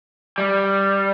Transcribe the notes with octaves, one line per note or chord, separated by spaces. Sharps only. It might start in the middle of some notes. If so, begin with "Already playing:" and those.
G3